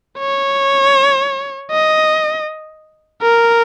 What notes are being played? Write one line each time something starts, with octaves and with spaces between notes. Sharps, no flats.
C#5
D#5
A#4